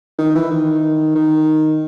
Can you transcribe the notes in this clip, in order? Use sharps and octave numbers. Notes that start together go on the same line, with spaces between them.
D#3
E3
D#3
D#3